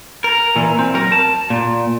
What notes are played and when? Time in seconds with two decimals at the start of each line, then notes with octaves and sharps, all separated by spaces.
0.24 A#4
0.56 A#2 E3
0.79 C4
0.94 F#3 A#4
1.12 A5
1.50 A#2